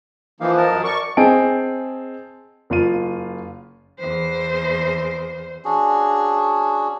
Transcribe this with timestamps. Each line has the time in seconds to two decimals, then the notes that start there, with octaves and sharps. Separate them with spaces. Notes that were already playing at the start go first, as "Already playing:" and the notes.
0.40 E3 F3 A#3 D#4 F5
0.57 A#4 D#5 A5
0.69 F#2
0.84 A#4 D5 C#6
1.17 C4 G#4 D#5 G#5 A5 D7
2.70 F#1 F4 D#7
3.99 E2 C5
5.65 C#4 D4 F#4 G#4